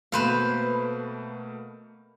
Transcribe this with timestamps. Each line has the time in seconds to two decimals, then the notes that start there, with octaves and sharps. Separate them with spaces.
0.12 B2 A3 A#3 B4 C5 F5